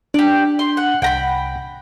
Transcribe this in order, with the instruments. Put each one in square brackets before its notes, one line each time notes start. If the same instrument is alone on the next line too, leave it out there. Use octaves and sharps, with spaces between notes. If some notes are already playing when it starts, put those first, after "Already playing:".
[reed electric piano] D4 [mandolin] G4 D5
[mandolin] C6
F#5
[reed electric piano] C2 F#5 [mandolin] G5 A#5 B5